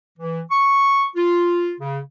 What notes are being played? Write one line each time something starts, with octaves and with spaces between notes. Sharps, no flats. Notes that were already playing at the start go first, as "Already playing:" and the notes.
E3
C#6
F4
C#3